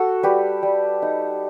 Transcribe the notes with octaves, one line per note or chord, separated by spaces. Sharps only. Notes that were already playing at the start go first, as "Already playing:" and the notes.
Already playing: F#4 A4
G3 G4 B4
G3
D#4